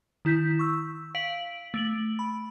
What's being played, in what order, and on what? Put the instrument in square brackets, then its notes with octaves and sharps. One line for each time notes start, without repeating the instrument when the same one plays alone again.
[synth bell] D#3 E4 G6 B6
C#6 E6
F5 B6 D7 F#7
A3 D7 F#7
B5